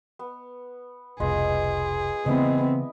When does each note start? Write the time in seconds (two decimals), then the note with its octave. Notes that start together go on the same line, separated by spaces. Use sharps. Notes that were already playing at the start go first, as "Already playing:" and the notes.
0.19 B3
1.20 F1 C2 B2 F4 G#4 B4 D#5
2.26 C#3 E3 A3 B3 C4 E4 D5 D#5